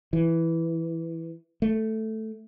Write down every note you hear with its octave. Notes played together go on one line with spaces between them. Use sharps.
E3
A3